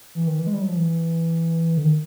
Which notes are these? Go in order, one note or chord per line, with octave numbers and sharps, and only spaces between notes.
E3
D#3
E3
G#3
G3
F#3
F3
E3
D3
D#3